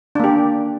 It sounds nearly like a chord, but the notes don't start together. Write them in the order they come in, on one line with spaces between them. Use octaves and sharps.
D4 A#3 G4